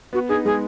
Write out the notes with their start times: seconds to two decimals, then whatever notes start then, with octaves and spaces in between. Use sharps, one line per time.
0.13 B3 F#4
0.29 D#4 G#4
0.45 G#3 G#4